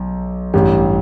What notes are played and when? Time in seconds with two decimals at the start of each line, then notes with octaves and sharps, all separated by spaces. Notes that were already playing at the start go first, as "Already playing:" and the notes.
Already playing: B1
0.54 A1 G2 G3